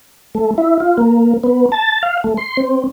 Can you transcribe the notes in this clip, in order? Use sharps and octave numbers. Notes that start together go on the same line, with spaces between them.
A3
E4
F4
A#3
B3
A5
F5
A3
C6
C4